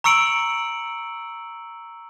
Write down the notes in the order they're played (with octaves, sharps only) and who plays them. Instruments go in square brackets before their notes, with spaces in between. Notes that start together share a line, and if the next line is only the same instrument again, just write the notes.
[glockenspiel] A#5 C#6 E6 C#7 D7 F#7